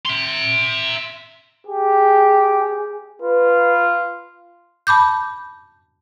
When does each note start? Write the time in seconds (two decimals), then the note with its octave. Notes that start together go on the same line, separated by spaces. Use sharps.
0.06 E5 C6
1.67 G4 G#4
3.22 F4 B4
4.87 A5 B5 D6 G6